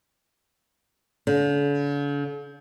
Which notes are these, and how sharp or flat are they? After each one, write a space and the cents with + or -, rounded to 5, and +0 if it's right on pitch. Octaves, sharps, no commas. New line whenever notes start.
D3 -45